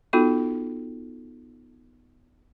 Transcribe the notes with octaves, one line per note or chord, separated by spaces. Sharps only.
B3 D#4 F4 F#4 A4